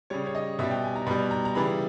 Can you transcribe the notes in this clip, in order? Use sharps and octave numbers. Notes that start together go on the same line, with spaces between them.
C#3 G3 C#5
C#5
D#5
B2 G3 E5
G5
G#5
A#5
B2 G3 B5
A#5
A#5
C#3 E3 G3 B5